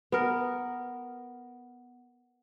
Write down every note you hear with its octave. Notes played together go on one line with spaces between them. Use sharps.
B3 A#4